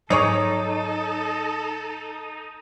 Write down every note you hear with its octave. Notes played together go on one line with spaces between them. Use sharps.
G#2 F#3 D#4 G#4 A4 C#5 D5